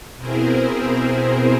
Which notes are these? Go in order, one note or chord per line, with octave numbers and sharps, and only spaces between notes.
B2 C4 E4 G#4 A#4 C5